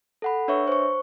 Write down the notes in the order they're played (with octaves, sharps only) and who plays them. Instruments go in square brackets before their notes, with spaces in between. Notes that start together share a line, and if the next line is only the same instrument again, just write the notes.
[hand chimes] A4 F#5 B5
D4 B4 C#5 E5 C#6
C5 C#6